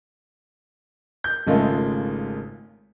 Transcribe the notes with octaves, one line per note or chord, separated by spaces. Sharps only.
G6
G#1 C#3 G#3 A3 F4